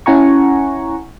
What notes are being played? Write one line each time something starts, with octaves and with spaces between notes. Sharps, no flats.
C#4 E4 F#5 G#5 A#5 C#6